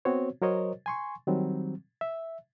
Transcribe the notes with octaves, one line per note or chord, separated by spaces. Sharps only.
B3 C4 F#4 C5 C#5
F#3 F#4 A#4 C5 C#5 D#5
G#5 C6 C#6
D#3 F#3 G3 C4
E5